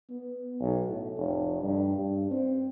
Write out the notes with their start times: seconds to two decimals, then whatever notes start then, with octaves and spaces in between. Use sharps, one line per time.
0.10 B3
0.60 B1
0.89 A2
1.17 F1
1.62 G2
1.98 G2
2.31 C4